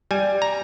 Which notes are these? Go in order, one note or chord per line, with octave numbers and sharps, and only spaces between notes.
G3 G#5
A#5